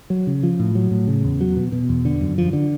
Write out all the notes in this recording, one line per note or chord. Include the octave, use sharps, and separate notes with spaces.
F#3
C#3
F3
A2
F#3
A2
C#3
E2
F#3
B2
B2
E2
D3
F#2
F3
D3